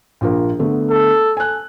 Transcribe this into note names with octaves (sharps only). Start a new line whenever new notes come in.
A#1 F4 A#4
D3 A3 B3
A4
G#5 F#6